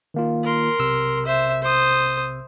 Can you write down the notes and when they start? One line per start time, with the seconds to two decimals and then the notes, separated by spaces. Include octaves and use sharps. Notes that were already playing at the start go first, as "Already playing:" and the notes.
0.14 D#3 A#3 F4
0.44 A#4 C6
0.79 B1 C3 E6
1.26 C5 E5
1.62 C5 D#6